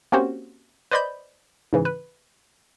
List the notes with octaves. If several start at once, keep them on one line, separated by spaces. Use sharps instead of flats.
A#3 C4 C#4 F#4 G4 C5
B4 C5 D5 D#5 B5 G6
G#2 C#3 E3
B4